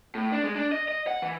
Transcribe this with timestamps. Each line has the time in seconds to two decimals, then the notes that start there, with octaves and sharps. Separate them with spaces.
0.15 A2
0.32 D4
0.44 G#3
0.55 D4
0.72 D#5
0.88 D#5
1.07 F#5
1.22 E3